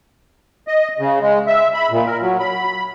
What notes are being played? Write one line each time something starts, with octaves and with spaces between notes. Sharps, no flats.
D#5
C#3
G#3
E5
B5
A#2
A#4
F#3
B5